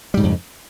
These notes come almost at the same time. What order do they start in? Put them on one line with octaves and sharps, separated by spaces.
G3 G#2 C#3 F2